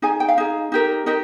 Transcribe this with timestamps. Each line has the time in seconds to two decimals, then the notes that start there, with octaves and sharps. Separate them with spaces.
0.02 D#4 G#4 G#5
0.20 G5
0.28 F5
0.38 D#4 G#4
0.72 D#4 G4 A#4
1.06 D#4 G4 A#4 D#5